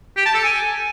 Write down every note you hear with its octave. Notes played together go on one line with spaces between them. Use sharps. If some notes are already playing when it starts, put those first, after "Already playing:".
G4
A5
A4
G#5